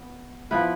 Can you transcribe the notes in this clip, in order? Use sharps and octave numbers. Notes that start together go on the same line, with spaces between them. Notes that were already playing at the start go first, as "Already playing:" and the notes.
Already playing: B3
F3 B3 E4 B4